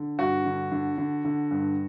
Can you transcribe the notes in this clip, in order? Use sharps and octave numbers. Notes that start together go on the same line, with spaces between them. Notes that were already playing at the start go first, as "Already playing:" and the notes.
Already playing: D3
G2 F#4
D3
D3
D3
D3
G2